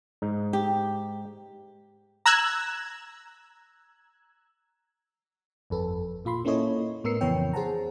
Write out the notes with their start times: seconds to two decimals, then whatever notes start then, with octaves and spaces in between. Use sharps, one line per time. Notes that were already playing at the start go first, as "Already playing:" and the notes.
0.22 G#2 D#4
0.53 G4
2.26 A#5 E6 F#6 G#6
5.70 G1 F2 A4 B4
6.25 A#2 F4 B5 C6
6.45 A#3 C#4 E4 A4 C#5 D#5
7.04 A2 B3 A#4 E6 C7 C#7
7.21 F2 C#3 E3 B3 C#5 G5
7.53 G#4 C5 F#5 A5 A#5